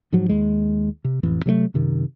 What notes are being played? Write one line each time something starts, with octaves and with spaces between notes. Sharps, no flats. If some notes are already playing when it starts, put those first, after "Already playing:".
G#2 F3 F#3
D#2 G#3
C3
A1 F2 E3
C3 F#3 G#3 A3
F#2 C3 D#3